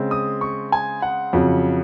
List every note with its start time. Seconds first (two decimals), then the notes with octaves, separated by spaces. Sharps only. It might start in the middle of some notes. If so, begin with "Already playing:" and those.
Already playing: C#3 G#3 C4
0.11 D#6
0.41 C#6
0.72 G#5
1.02 F#5
1.33 F2 C#3 F#3